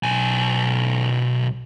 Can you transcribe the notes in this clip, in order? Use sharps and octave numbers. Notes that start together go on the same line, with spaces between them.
B1 G#5